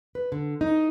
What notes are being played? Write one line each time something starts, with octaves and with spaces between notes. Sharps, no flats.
B4
D3
D#4